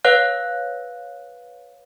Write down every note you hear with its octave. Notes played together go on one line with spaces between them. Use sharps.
B4 C#5 F5 F#6